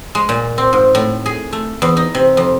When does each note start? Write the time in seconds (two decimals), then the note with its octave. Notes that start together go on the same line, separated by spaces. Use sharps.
0.15 G#3
0.29 A#2
0.58 C4
0.73 G#2
0.95 A2
1.26 G#4
1.53 A3
1.82 E2
1.97 D#4
2.15 C3
2.37 F2